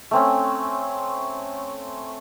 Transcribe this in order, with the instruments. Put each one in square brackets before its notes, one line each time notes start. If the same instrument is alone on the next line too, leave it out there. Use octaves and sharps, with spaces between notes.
[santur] A3 C4 C#4